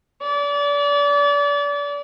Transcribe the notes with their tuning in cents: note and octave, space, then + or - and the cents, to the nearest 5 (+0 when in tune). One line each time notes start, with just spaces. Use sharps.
D5 -35